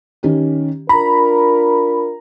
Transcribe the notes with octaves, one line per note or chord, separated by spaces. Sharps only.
D#3 C#4 G4
D4 F4 A#4 A#5 B5